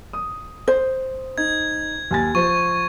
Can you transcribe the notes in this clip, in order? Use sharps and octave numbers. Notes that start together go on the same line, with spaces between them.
D#6
C5
D#4 G#6
D#2 G#5 A6
F3 C5 C#6